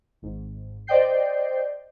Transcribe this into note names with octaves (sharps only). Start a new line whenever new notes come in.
G#1 G#2
C5 D5 D#5 G5 G6 C7